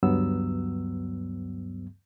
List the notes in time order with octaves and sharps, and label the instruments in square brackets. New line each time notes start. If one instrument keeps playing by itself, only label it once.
[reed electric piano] D2 G2 F#3 B3 E6